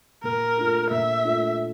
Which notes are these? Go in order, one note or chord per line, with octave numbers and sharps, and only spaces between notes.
A#2 A#4
A3 D4 F4
A#2 E5
A3 D4 F4